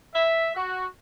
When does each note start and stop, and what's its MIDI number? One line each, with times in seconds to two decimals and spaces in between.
0.14 0.52 76
0.56 0.86 66